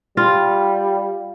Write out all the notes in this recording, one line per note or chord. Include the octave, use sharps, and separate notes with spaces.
G3 F4